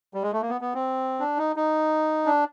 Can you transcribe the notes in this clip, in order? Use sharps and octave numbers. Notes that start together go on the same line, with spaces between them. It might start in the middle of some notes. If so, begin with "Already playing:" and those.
G3
G#3
A3
A#3
B3
B3
C4
D4
D#4
D#4
D4